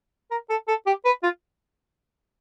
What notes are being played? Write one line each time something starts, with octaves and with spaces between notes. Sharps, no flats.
A#4
A4
A4
G4
B4
F4